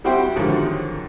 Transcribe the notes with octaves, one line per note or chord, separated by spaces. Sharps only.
G3 E4 F#4 G4 C5 G5
G#2 D3 D#3 F3 F#3